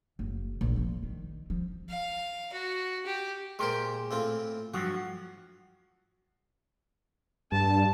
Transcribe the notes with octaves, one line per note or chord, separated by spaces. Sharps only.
F#1
A#1
F3
D#3
F3
F5
F#4
G4
A#2 G#3 G4 A#4 C5 C6
A2 C4 F4
G2 F3 F#3 F#4
G2 A5